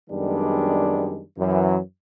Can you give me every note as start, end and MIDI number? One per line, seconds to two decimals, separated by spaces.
0.10 1.22 42
0.10 1.22 51
0.10 1.22 55
0.10 1.22 56
0.10 1.22 59
0.10 1.22 62
1.38 1.78 42
1.38 1.78 52
1.38 1.78 54